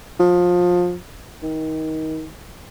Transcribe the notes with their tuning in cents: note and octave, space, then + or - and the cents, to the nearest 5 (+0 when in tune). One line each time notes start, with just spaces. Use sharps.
F3 +25
D#3 +20